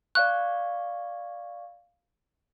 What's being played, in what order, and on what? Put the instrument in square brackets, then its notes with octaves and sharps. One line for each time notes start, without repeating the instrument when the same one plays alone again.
[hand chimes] D5 F5 C#6 [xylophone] F#6